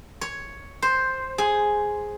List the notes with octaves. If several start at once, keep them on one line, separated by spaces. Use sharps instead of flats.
C#5
C5
G#4